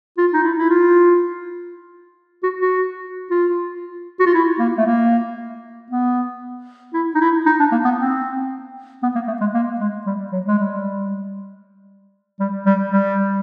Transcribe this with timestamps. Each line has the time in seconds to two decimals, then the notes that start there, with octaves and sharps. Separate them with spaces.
0.18 F4
0.33 D#4
0.43 E4
0.58 E4
0.70 F4
2.43 F#4
2.61 F#4
3.30 F4
4.20 F#4
4.26 F4
4.34 E4
4.59 A#3
4.77 A3
4.86 A#3
5.90 B3
6.93 E4
7.15 D#4
7.21 E4
7.46 D#4
7.59 D4
7.72 A#3
7.85 B3
7.99 C4
9.03 B3
9.15 A#3
9.28 A3
9.41 G#3
9.54 A#3
9.80 G#3
10.06 G3
10.32 F#3
10.46 G#3
10.59 G3
12.40 G3
12.66 G3
12.92 G3